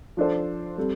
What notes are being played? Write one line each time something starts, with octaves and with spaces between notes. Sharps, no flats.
F3 D4 A4 C5
G3 C4 A4